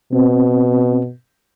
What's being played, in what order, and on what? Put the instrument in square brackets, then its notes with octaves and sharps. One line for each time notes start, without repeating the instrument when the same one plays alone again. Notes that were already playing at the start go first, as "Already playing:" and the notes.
[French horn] B2 [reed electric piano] C4